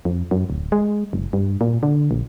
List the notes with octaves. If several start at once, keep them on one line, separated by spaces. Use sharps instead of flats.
F2
F#2
D1
G#3
F#1
G2
A#2
D3
A#1